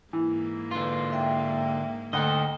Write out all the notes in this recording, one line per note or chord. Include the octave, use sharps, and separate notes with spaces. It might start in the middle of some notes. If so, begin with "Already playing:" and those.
G#2 E3 A#3
D3 F4 B4
E5 G5
D2 A4 D#5 F#5 G5